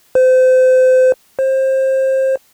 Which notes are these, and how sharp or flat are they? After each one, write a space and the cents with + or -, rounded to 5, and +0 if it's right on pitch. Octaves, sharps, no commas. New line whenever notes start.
C5 -30
C5 +25